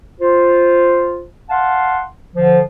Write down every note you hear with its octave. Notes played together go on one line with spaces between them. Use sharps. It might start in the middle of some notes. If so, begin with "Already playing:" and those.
F4 C5
F5 F#5 A5 C6
D3 F3